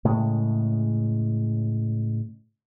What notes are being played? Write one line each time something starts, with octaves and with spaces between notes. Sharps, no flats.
A2 C#3 G#3